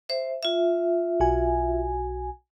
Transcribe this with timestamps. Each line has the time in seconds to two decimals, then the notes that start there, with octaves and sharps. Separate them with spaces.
0.09 C5 E5
0.43 F4 E5
1.20 B1 F#4 G#5